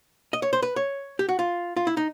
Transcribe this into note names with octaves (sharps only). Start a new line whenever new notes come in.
D#5
C#5
C5
B4
C#5
G4
F#4
F4
F4
E4
D#4